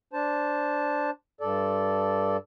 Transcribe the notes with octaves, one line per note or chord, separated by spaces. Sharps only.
D4 C5 A5
G2 A4 D5